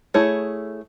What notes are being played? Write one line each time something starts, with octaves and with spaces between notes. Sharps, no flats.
A3 E4 G#4 C#5